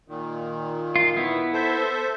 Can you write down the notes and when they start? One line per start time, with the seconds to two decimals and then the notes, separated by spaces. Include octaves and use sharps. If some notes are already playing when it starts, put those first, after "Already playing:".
0.08 A#2 D#3
0.96 F4
1.17 B3 E4
1.53 A4 C5 E5